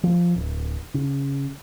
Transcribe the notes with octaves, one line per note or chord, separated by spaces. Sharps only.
F3
D1
C#3